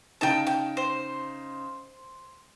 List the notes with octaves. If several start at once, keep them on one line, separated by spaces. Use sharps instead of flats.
C#3 D#4 G5 A5 E7
G5
C5